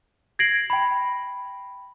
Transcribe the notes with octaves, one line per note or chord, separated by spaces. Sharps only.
G#6 A#6 C7 D7 F#7
G5 B5